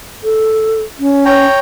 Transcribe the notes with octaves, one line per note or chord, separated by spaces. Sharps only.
A4
C#4
C#5 G5 A#5